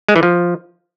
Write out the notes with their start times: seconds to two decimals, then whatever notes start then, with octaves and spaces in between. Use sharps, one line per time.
0.08 G#3
0.16 E3
0.23 F3